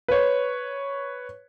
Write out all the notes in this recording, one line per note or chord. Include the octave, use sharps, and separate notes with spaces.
B4 C#5